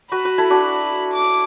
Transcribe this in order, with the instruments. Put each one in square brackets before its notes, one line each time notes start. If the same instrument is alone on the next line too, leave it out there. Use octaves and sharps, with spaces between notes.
[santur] F#4 B4 [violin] B5
[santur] F#4 B4
E4 A4
D4 F#4
[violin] D6